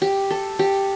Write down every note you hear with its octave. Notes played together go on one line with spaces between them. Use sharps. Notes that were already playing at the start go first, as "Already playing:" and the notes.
G4
A4
G4